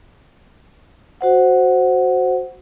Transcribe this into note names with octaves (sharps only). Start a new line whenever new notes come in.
F#4 C5 F#5